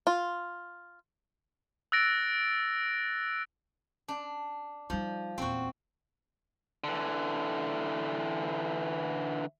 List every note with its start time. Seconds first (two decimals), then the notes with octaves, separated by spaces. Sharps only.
0.07 F4
1.92 E6 F#6 A6 A#6 D7
4.08 D4
4.90 F3 G3 D#4
5.38 D#1 E2 C4 F#4
6.84 D3 E3